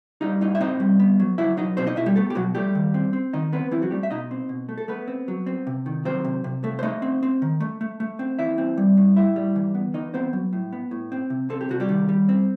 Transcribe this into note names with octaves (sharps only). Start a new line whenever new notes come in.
G3 D#4 D#5
A2 D#4 D#5
E5
C4 D#4 D#5
G3
B3
F#3
F#3 E4 E5
F#3 D#4 D#5
B2 C4 C5
D#4 D#5
B2 E4 E5
G3 G4
A3 B3 A4
G4
B2 F#3 F#4
G3 A3 G4
D#3
C4
C4
D#3 D#4 D#5
B3 C4 B4
E3 C4 E4
F#3 F#4
G3 A3 G4
E5
B2 D#4 D#5
C4
B2
A3
A4
A3 B3 B4
C4
F#3
C4
C3
D#3
F#3 C4 C5
C3
C3
A3
C5
A3 D#4 D#5
C4
C4
D#3
A3
A3
A3
C4
E3 E4 E5
C4
G3
A2
A2 E4 E5
G3
E3
B3
E3 D#4 D#5
B3 C4 C5
F#3
A2
B3
A2
C4
C3
C4 A4
G4
C3 F#4
G3 G4
D#3
G3
C4